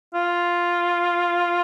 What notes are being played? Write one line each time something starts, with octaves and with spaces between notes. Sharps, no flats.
F4